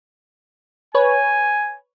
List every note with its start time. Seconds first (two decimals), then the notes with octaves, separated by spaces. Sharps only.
0.95 B4 C#5 G#5